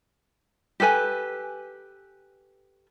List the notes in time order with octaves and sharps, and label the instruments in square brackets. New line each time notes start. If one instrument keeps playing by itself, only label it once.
[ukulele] G4 A4 B4 G#5